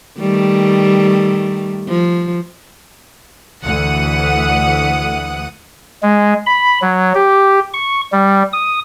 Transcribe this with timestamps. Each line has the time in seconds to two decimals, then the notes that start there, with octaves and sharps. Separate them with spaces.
0.19 D#3 G3 A3
1.89 F3
3.63 D2 E3 F#5 D#6
6.03 G#3
6.46 B5
6.82 F#3
7.15 G4
7.74 C#6
8.12 G3
8.53 D#6